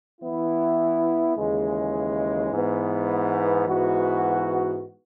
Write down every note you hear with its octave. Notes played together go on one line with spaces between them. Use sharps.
E3 B3 E4
D#2 C#3 E3 G#3
G#2 E3 B3
G#2 E3 B3 F#4